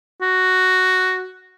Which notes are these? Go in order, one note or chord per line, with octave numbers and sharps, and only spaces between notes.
F#4